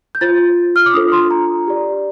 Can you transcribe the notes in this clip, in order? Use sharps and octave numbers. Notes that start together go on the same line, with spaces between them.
G6
F4 C5 A6
F6
D6
D4 F4 A4 C5 D#6
C6
A#5
G4 D5